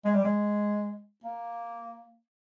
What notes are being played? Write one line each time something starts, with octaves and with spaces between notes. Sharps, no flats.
G#3
G3
G#3
A#3